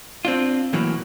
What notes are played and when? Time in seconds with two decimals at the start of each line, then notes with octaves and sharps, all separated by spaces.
0.25 C4 D4 F4
0.73 A2 E3 F#3 A#3